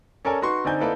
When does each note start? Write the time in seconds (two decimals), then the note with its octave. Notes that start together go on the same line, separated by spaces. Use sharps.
0.25 C#4 A4 A#4 D5 G#5
0.42 D#4 F#4 B4 C6 C#6
0.65 D3 C4 D#4 D5 G#5 G6
0.80 A#3 E4 A4 B4 D5 D#5